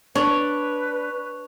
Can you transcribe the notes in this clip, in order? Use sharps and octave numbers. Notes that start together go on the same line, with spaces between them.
D4 B4 C#5